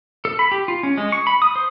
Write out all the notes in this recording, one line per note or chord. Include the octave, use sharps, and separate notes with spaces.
A4
B5
G4
F4
C#4
G#3
C#6
B5
D#6
C5